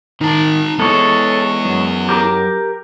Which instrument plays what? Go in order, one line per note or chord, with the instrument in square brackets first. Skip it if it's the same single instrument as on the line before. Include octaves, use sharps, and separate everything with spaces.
[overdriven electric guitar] D#3 [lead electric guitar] D#4 A5
[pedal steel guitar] G#3 C#4 C#5 [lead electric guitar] B3 E4 [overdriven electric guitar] A4
[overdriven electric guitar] F#2
[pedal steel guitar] G4 A#4 D6